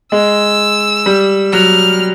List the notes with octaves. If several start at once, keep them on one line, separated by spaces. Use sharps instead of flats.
G#3 E6
G3
F#3 F6